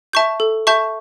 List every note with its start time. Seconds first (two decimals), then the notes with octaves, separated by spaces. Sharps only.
0.13 E5 A5 C#6 G6
0.40 A4
0.67 E5 A5 C#6 G6